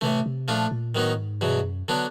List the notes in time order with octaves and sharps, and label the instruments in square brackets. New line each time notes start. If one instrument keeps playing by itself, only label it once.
[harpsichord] A2 E3 A3 [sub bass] C3
[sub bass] C3
[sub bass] A#2 [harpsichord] F3 A3 D4 F4
[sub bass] A#2
[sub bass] A2 [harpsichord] D#3 F#3 B3 D#4
[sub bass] G#2
[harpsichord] E2 B2 F#3 [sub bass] G2
[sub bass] F#2
[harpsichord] D3 F#3 B3 D4